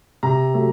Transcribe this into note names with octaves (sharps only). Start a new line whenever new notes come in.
C3 A#5
F#3 A3